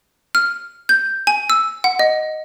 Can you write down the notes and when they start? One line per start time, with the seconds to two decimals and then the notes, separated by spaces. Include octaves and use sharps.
0.35 F6
0.89 G6
1.27 G#5
1.50 E6
1.84 F#5
1.99 D#5